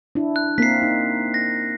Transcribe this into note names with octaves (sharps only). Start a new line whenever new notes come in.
D4 E4
F#6
A#3 C4 A#4 B6 C7
D#4
A#6